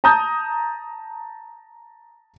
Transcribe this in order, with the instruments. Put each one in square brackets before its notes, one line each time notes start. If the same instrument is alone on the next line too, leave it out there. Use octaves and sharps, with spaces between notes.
[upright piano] A5 A#5 D#6 G6